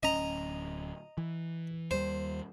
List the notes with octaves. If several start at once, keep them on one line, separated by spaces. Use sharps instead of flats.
D1 C#4 D#5 A#5
E3
D#2 G3 C5